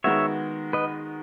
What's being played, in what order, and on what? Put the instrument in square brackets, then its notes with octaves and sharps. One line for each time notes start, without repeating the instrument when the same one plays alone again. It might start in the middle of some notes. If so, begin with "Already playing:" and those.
[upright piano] D#3 G#3 B3 F#4 [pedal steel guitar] C#5 E5
[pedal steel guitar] B4 D#5